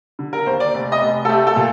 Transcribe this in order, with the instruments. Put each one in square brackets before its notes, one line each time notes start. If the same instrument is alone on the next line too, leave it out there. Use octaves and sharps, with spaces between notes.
[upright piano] D3
A#4
D#2 C5
D5
F1
D#5
F1
A4
A3 G4
A4
A#2